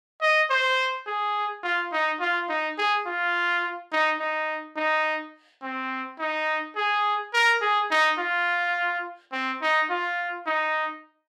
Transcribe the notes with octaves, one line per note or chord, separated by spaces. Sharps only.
D#5
C5
G#4
F4
D#4
F4
D#4
G#4
F4
D#4
D#4
D#4
C4
D#4
G#4
A#4
G#4
D#4
F4
C4
D#4
F4
D#4